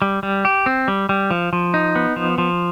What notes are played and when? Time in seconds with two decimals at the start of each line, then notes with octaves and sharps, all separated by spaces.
0.02 G3
0.23 G3
0.45 G4
0.66 C4
0.88 G3
1.09 G3
1.31 F3
1.53 F3
1.74 D#4
1.95 B3
2.16 F3
2.38 F3